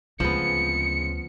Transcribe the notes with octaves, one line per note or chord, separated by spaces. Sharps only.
D2 C#3 F3 G#3 B3 C4 C#7